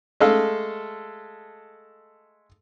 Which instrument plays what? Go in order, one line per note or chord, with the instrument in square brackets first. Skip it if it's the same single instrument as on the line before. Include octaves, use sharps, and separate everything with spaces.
[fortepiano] G#3 A3 A4 F5